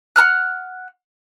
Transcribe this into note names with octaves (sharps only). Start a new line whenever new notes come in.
F#5 A#5 F6 F#6